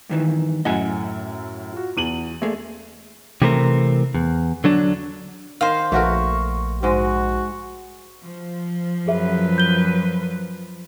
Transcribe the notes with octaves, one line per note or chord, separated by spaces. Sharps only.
G2 D#3 E3
F#2 A2 D#5 F#5 G#5
F4 F#4
E2 D#7 F#7
A3 A#3 G#4
C3 E3 A3 C4 A#4
E2
D3 F#3 D4
D#3 C5 F5
A#1 A3 F#4 A#4 C#6
G#2 G#3 F#4
F3
F#2 G#4 B4 E5
G6 G7